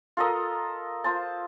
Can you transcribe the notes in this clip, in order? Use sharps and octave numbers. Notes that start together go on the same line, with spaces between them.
F4 A4 A#4 D#5
F4 C5 A5